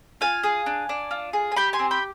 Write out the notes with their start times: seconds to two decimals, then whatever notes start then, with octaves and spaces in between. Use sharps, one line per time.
0.21 F4 F5 G#5
0.43 G#4
0.66 D4
0.89 D4
1.11 F4
1.33 G#4
1.52 G#5
1.56 G4 G5 B5
1.73 G#5 C6
1.79 C4
1.91 G5 B5